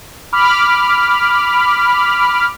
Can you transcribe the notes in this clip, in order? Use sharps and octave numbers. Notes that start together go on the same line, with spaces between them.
B5 D6 F6